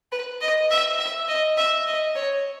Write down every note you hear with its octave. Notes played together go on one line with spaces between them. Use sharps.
B4
D#5
E5
E5
D#5
E5
D#5
C#5